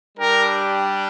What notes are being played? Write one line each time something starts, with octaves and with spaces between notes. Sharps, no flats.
G3 D4 G4 A#4